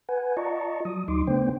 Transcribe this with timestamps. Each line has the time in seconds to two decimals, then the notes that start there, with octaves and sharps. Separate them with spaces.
0.09 B4 F#5 G#5
0.37 F4 D5 D#5 A5 A#5 C#6
0.85 F#3 D#6
1.08 D2 F#3 D#4 C6 D6
1.27 C#3 A3 B3 D4 C5 G5